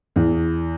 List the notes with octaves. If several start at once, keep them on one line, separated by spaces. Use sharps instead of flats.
E2